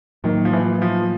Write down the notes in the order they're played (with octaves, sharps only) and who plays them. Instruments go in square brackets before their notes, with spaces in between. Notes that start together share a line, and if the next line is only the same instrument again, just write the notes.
[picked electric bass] A2 F#3 A#3 [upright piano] D#3
[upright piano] F3
E3
F3